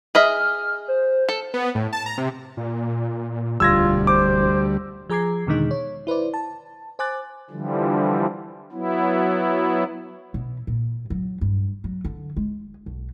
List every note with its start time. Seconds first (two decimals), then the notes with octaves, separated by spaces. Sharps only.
0.15 G#4 D#5 E5 F6
0.88 C5
1.29 A4
1.54 B3
1.75 A2
1.93 A5
2.06 A#5
2.18 C3
2.57 A#2
3.60 E1 D2 G3 F4 E6 G#6 A#6
4.07 C5 D6
5.10 F3 G#4 A#5 D6 G#6 C7
5.47 E2 B2 D3 D#3 G#3 D#4
5.71 C#5
6.07 E4 B4 C5 D5
6.34 A5
6.99 C5 G#5 D6 F#6 A6
7.50 D3 E3 F3 G3
8.72 F#3 B3 E4
10.34 B2
10.67 A#2
11.10 F#3
11.41 G2
11.84 F#3
12.05 D3
12.37 G#3
12.86 B1